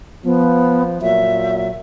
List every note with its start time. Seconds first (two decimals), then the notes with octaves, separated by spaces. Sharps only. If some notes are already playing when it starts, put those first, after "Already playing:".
0.25 F3 B3
1.02 A#2 F#3 E5